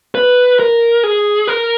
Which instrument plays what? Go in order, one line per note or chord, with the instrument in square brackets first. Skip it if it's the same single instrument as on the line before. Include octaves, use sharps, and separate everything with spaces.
[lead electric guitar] B4
A#4
G#4
A#4